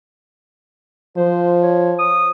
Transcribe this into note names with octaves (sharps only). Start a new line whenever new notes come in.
F3 C5
C#5
D#6